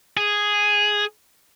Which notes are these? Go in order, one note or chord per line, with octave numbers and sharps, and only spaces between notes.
G#4